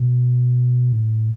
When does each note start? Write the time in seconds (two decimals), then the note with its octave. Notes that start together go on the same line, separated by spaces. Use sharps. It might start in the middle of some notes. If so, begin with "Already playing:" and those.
Already playing: B2
0.93 A2